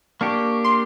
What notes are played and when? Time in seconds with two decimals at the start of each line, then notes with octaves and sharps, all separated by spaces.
0.21 A#3 D4 G4 C#6
0.64 C6